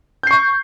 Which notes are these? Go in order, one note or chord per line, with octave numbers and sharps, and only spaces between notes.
C#6 G6 C7